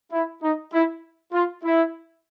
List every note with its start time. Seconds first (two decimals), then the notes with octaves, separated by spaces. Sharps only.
0.12 E4
0.42 D#4
0.73 E4
1.33 F4
1.63 E4